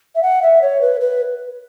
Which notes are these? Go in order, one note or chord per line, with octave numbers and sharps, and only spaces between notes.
E5
F#5
E5
C#5
B4
B4